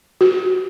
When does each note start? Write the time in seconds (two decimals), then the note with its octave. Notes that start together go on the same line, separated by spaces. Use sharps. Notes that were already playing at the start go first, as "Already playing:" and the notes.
0.21 F#4